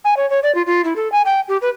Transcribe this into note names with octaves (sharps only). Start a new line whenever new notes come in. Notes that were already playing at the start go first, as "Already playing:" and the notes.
G#5
C#5
C#5
D5
F4
F4
E4
A4
G#5
G5
G4
B4